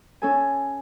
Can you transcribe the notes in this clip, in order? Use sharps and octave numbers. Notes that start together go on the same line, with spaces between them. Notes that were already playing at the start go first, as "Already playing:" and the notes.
C#4 A4 G#5